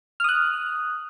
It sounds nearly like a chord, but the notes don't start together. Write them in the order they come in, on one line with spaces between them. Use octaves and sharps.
F6 D#6 F#6